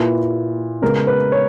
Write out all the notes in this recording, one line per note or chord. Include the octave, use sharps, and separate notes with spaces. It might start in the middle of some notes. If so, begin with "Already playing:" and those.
Already playing: A#2 A#3 E4 B4
C#3 G#3 B3 A#4
B4
C#5